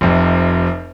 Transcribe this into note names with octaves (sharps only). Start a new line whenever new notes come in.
F1 F2 C3